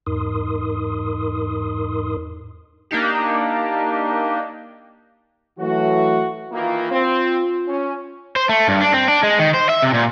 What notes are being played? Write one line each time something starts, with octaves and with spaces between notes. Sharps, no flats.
E2 G#2 D#4 A#4 C6 D#6
A#3 D4 D#4 G4
E3 F#3 A3 F#4
D#3 E3 A#3 F4
C4
C#4
C5
A3
G2
D4
C4
D4
G#3
D#3
C5
E5
C3
A#2